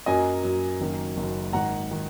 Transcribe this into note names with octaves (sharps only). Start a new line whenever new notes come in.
F#2 F#3 A#3 D#5 G#5
F#2 F#3 A#3
F#1 F#2 D#3 A#3
F#1 F#2 D#3 A#3
G#1 G#2 D#3 F#5 A#5
D#3